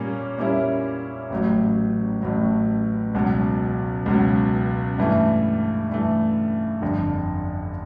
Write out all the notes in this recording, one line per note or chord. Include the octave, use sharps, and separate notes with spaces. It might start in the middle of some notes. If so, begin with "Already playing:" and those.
Already playing: A#2 G3 A#3 C#4
A#2 G3 A#3 C#4 E4
A1 A2 F#3
A1 A2 F#3
C#2 B2 F#3
C#2 B2 F#3
G2 E3 A3
G2 E3 A3
G1 F2 D3